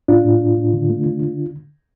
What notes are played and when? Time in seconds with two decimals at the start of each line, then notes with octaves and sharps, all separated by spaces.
0.08 A2 D4 F4
0.25 A2
0.41 A2
0.57 A2
0.73 D3
0.90 A3
1.06 D3
1.22 D3